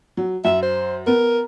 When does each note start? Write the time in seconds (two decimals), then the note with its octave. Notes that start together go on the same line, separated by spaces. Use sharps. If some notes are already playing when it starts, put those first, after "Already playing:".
0.17 F#3
0.45 F#2 E5
0.63 C5
1.07 B3 A#4